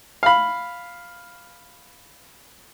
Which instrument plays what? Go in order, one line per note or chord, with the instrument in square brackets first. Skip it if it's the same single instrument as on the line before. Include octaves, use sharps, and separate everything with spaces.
[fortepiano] F5 B5